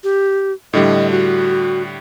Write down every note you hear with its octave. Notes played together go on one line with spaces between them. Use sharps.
G4
A2 D3 G3 D#5
F#4